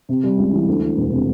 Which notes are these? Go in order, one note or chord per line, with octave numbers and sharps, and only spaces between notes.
C3
G3
C#2
E3
D2
E3
E1
C3